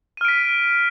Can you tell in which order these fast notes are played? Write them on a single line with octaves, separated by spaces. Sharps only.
D#7 F6 D7 B6